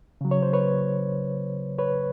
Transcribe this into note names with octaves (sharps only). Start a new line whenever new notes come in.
C#3 F#3
C#5
C5
B4 C#5
B4 C#5